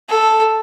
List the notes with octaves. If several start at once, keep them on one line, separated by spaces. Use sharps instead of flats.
A4